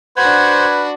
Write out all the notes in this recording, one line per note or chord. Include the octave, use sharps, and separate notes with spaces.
D4 F#4 B4 C5 F#5 G#6